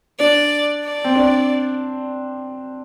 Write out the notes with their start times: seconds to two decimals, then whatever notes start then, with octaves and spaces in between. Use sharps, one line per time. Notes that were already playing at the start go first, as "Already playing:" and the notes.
0.19 D4 D5
0.84 D5
1.04 C4
1.15 D4